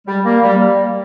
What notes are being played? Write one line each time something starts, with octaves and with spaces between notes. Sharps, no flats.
G3
A#3
G3